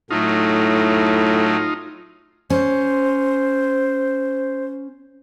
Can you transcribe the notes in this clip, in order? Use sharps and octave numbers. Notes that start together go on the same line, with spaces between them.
A2 F#3 A3 D#4 F4
C#4 C5